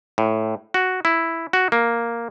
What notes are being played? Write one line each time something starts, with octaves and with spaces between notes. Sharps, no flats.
A2
F#4
E4
F#4
A#3